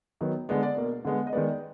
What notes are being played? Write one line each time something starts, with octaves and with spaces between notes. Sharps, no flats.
D#3 F#3 B3
D3 G#3 B3 D5
D5
B2 A#3
D3 G#3 B3
D#5
D#3 G#3 B3 D5